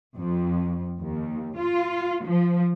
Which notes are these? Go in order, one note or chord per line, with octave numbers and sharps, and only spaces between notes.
F2
D#2
F4
F3